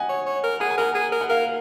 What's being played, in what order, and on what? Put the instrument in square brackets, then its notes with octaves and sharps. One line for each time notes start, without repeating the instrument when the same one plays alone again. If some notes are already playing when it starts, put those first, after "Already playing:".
Already playing: [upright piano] D#5 F#5 G#5
[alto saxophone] C#5
C#5
A#4
[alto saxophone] G#4 [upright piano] F#5
[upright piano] G#5
[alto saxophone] A#4 [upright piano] F#5
[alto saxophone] G#4
A#4
[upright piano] F#5
[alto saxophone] A#4 [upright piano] F5